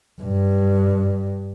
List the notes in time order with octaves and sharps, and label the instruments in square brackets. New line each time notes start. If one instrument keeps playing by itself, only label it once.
[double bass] G2